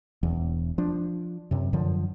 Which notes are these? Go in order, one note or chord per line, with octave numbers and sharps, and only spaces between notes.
E1 E2
F3 D4
F#2 C3
F#2 D3 F3